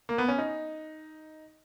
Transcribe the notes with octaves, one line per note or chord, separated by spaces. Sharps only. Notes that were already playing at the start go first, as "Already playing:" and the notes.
A#3
B3
C#4
D#4